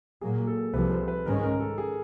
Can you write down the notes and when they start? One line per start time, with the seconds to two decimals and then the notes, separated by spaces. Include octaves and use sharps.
0.21 A#2 F#3 A#3 G#4
0.47 A4
0.74 C2 C3 F3 B4
0.92 C5
1.08 B4
1.26 G#2 D#3 G#3 C#4 A#4
1.43 A#4
1.60 A4
1.78 G#4